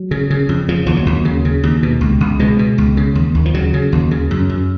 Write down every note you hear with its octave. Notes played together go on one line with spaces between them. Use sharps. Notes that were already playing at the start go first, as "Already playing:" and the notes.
Already playing: F#3
C#3
C#3
F2
C#3 F3
D#2 F3
F#3
D#2
C#3
C#3
D#2
B2
C#2
C#2
B2 G#3
B2
C#2
C#3
D#2
D#2
F3
C#3 F#3
C#3
D#2
C#3
F#2
F#2